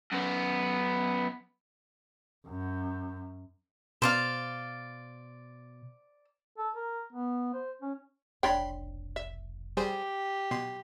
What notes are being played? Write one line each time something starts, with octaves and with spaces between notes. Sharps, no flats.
F#2 B3
F#2
B2 C5 D5 F5
A4
A#4
B3
C5
C#4
F1 B1 D4 C#5 G5 B5 C6 C7
E5
G3 G4 G#4 C5
B2 F#3 C6